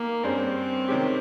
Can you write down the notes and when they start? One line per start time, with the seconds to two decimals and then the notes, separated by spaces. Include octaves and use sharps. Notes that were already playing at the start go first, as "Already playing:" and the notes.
Already playing: A#3 D#4 G4
0.23 G2 G3 C4 C#4 G#4 C5
0.88 C3 D#3 G#3 C#4 G4